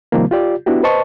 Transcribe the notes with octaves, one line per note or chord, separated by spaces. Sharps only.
C3 D#3 F3 G3 A#3
F4 G4 D5
B3 D4 E4 F#4 G4
B4 C5 D#5 A5 C#6